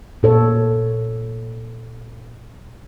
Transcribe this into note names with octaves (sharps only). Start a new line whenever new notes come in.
A#2 A4 C#5